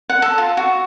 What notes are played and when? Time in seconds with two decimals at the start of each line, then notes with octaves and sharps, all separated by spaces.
0.10 F#5
0.22 A4
0.38 F4
0.57 F#4